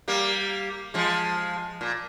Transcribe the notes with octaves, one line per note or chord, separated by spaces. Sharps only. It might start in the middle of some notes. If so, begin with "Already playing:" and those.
G3 A#3
F3 G#3
A#2